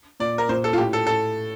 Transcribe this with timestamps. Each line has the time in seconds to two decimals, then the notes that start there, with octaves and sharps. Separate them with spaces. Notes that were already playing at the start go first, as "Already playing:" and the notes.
0.20 A#2 D5
0.38 A#4
0.49 A#2 C5
0.64 A4
0.73 F4
0.78 A2 G4
0.93 A4
1.07 A2 A4